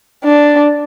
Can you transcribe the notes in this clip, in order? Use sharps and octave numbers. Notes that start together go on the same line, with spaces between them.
D4